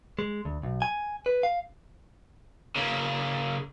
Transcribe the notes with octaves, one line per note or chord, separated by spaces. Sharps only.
G#3
D2
B1
G#5
B4
F5
C#3 A#3